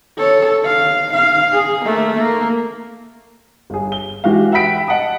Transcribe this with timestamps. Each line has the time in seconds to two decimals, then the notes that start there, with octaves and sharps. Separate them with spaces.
0.19 A4 C#5
0.66 F5
1.14 F5
1.53 G#4
1.86 A3 A#3
2.19 A#3
3.70 G1 G#4
3.92 G7
4.24 E3 G#3 F#4 G4 F5
4.52 E5 F#5 G5 B5 B6 D7
4.88 D#5 F#5 A5 D#6